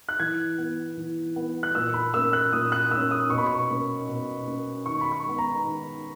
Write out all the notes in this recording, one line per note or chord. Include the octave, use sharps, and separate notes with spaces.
F#6
E3 G#6
B3
E3
B3
F#6
A#2 E6
B5
A#3 C#4 E6
F#6
A#2 D#6
F#6
A#3 E6
C#4
D#6
B2 C#6
B5
C#6
A#3 C#4
B2
A#3 C#4
D#3 C#6
B5
C#6
G#3 B3
A#5
D#3